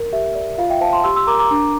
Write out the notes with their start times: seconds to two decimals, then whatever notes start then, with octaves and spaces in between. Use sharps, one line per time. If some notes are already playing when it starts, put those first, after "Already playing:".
Already playing: A#4
0.13 G4 E5
0.35 D5
0.58 F4 F5
0.69 E5 G5
0.81 C5 F5 A5
0.92 A5 C6
1.04 G4 C6 E6
1.16 C6 E6
1.27 A#4 A#5 D6
1.39 A#5 D6
1.51 D4